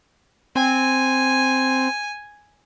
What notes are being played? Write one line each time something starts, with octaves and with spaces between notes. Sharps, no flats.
C4 G#5